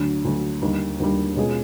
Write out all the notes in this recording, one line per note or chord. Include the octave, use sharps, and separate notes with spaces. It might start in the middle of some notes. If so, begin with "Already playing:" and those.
Already playing: D2 D3 F#3
D2 D3 F#3
D#2 D3 G3
D#2 D3 G3
B2 G#3 C#4 F4 G#4